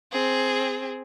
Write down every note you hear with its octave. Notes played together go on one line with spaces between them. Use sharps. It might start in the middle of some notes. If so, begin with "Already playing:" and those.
C4 G#4